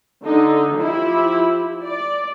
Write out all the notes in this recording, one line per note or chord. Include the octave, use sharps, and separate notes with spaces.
D3 D#4
F3 E4 G4
D5